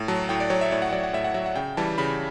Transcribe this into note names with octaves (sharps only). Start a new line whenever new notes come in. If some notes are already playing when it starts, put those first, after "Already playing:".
Already playing: A2
F#3 A5
A2 G5
D5
F#3 C#5
E5
A2 D5
F#5
F#3 D5
F#5
A2 E5
F#5
F#3 E5
F#5
C#3 G5
E3 G3 A5
C#3 B5